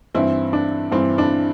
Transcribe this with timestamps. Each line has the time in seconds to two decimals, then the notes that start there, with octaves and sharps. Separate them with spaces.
0.15 G2 E3 C4 E4
0.53 D4
0.91 G2 E3 C4
1.18 D4